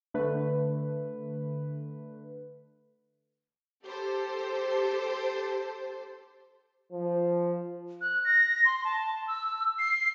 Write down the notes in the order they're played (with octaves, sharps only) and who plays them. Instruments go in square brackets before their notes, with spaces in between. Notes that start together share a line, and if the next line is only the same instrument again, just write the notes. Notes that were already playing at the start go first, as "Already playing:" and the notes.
[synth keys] D3 A3 B4
[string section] G4 A4 C5
[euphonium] F3
[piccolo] F#6
A#6
C6
A5
E6
C7